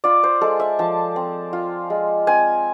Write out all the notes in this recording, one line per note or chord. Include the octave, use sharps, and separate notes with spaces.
F4 D5
C5
G#3 A4
E5
F3 A5
C4
F4
G#3
C4 G#5